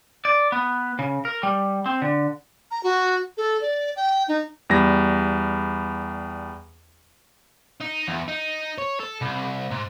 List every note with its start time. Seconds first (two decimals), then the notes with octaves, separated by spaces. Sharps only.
0.25 D5
0.52 B3
0.99 C#3
1.25 A#4
1.43 G3
1.86 C4
2.02 D3
2.71 A#5
2.83 F#4
3.37 A4
3.61 D5
3.96 G5
4.28 D#4
4.70 E2 G3 A#6
7.80 D#4
8.07 E2
8.28 D#4
8.78 C#5
9.00 A4
9.22 C2
9.71 G#2